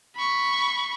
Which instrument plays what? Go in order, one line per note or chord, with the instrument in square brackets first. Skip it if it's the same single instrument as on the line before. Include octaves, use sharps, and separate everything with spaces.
[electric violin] B5 C#6